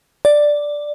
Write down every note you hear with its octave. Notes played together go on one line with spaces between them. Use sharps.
D5